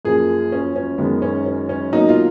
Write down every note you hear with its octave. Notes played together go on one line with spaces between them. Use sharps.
F#2 F3 A#3 G#4
C#4
C#4
F#2 D#3 G#3 B3
C#4
C#4
C#4
B2 F#3 A#3 D#4
F4